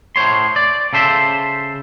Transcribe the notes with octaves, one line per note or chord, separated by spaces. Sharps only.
A2 C5 C#5 C6
D5
C#3 A4 C5 E5